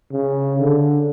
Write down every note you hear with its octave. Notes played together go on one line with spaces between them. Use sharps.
C#3
D3